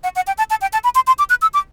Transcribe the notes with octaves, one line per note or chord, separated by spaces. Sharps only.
F#5
F#5
G5
A5
A5
G5
A5
B5
C6
C6
D6
F#6
E6
D6